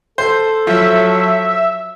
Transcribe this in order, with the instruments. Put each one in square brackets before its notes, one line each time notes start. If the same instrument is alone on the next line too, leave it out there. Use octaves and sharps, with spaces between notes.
[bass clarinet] A4 [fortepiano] C5
[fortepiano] F3 [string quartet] F#3 [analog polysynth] E5